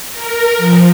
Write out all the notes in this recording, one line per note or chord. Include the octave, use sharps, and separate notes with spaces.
A#4
F3